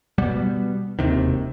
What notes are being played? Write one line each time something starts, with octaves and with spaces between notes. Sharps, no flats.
B2 G3 B3
E1 D#2 C3 D#3